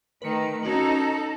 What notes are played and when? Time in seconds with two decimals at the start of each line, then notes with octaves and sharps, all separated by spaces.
0.22 D#3 A3 B4 C#7
0.63 C#4 D#4 F#4 A4 F#7